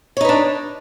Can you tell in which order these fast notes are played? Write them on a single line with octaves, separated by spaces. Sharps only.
C#5 D#4 B4 D4